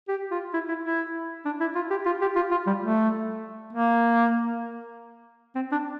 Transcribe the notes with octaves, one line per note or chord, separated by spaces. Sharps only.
G4
F4
E4
E4
E4
D4
E4
F4
G4
F4
G4
F4
F4
G3
A3
A#3
C4
D4